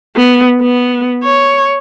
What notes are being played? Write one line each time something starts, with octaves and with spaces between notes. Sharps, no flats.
B3
B3
C#5